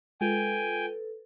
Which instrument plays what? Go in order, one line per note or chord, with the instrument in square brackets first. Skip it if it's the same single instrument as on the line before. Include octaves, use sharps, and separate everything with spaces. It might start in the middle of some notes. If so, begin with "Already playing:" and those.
[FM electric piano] G#3 F4 [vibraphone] A4 B4 [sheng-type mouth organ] G5 G#5